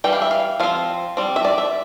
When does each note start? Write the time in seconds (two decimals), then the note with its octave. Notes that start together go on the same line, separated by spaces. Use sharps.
0.04 E3 G3 G5
0.13 F5
0.22 E5
0.31 F5
0.60 F3 C4 F5
1.17 G3 C4
1.36 E5
1.45 D5
1.58 E5